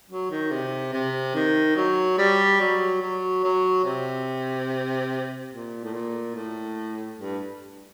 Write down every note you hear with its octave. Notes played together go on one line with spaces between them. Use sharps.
F#3
D#3
C3
C3
D#3
F#3
G3
F#3
F#3
F#3
C3
A#2
A2
A#2
A2
G2